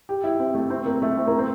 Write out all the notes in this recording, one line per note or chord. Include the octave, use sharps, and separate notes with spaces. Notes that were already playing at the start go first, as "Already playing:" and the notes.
G4
E4
C4
A3
C4
A#3
A3
C4
A#3
C4